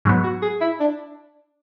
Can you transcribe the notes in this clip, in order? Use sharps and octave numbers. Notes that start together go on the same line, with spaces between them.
G#2 F#3 B3
F#4
G#4
E4
D4